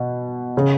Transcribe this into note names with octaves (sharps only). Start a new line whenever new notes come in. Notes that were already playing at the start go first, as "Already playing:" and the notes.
Already playing: B2
C#3